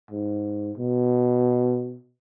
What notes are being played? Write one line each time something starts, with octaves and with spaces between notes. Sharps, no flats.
G#2
B2